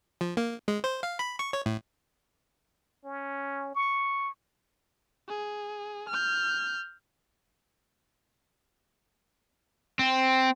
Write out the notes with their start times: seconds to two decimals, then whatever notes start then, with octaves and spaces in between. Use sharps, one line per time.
0.21 F3
0.37 A#3
0.68 G#3
0.84 C5
1.03 F5
1.19 B5
1.39 C#6
1.53 C#5
1.66 A2
3.05 C#4
3.75 C#6
5.29 G#4
6.09 F6 G6
9.99 C4